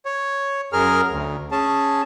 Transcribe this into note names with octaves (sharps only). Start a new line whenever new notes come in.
C#5
F#2 G#4 A#4 F6
D2
C#4 G#4 A5